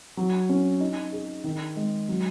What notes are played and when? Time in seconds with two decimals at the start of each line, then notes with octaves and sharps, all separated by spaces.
0.17 F#3
0.49 C#4
0.80 D#4
1.12 G#4
1.44 D#3
1.76 G#3
2.09 F#3